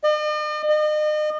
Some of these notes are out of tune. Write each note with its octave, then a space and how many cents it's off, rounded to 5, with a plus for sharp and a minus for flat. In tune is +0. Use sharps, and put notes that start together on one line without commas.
D#5 -45
D#5 -40